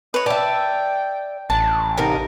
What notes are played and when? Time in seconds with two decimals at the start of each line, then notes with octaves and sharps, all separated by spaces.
0.14 B4 C#5 D#5
0.26 D5 E5 G5 A5
1.50 A1 D4 A5
1.98 C3 D#4 A#4 A#5